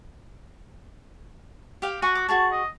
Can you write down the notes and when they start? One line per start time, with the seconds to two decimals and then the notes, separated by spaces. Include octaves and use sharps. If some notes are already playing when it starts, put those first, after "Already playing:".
1.82 G4 F5 G5
2.02 F#4 G#5 B5 C#6
2.15 D6
2.29 F#4 G#4 A5 C#6
2.52 D#5